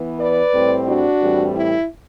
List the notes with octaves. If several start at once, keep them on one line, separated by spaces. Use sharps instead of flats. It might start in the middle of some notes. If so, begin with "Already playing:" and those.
Already playing: E3 B3
B4 D5
A2 G3 C4
D4 F#4
A2 E3 G3 C4
E4